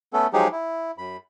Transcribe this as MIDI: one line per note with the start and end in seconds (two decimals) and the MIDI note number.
0.13 0.27 57
0.13 0.27 59
0.13 0.27 61
0.13 0.27 69
0.33 0.48 53
0.33 0.48 54
0.33 0.48 56
0.33 0.48 63
0.33 0.48 67
0.33 0.48 68
0.52 0.91 64
0.98 1.17 42
0.98 1.17 83